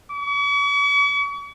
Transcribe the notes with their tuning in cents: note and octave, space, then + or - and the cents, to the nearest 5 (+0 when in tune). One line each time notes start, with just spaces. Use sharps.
C#6 +45